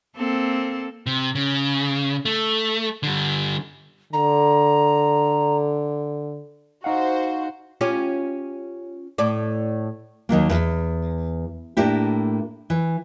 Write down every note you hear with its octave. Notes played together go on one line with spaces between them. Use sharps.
A#3 C4 A4
C3
C#3
A3
D3 G3
D3 A#5
D#4 F#4 C5 F5 F#5
C#4 F4 G4
A2 D5
D#2 D#3 F#3 A#3
E2
A2 A#3 D4 E4 G4
E3